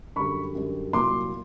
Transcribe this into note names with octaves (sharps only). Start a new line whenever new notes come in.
F#2 D3 G3 B5 C#6
F#2 D3 G3
C2 A#2 F#3 C6 D6